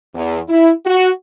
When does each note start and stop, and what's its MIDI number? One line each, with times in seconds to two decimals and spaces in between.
0.15 0.39 40
0.49 0.71 64
0.86 1.09 66